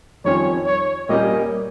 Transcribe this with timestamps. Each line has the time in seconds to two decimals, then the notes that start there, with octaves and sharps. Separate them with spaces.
0.25 F2 D#3 G3 C#4 F4 C#5
0.67 C#5
1.09 A#2 G3 A#3 C#4 G4 D#5